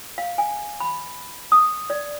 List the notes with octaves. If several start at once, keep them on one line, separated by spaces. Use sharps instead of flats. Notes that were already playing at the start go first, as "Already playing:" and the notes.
F5
G#5
B5
D#6
D5